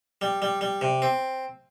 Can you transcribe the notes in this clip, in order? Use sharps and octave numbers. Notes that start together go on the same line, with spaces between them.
G3
G3
G3
C3
C4